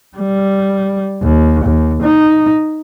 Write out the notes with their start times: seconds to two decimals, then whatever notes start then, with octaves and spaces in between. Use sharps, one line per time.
0.17 G3
1.22 D#2
1.65 D#2
2.03 D#4